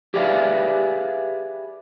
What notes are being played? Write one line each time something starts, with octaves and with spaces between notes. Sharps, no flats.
G4 G#4 B4 D5 E5 F5